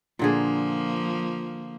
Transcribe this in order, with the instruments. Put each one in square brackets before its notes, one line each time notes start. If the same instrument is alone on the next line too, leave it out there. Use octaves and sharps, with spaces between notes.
[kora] A#2 D3 G#4 [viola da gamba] F3 A#3